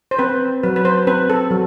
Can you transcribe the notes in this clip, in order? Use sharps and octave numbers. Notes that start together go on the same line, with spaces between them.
C5
C4 B4
F#3 B4
B4
C5
C4 B4
A4
F#3